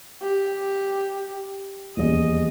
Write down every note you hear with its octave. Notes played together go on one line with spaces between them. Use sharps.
G4
D#1 E2 D#5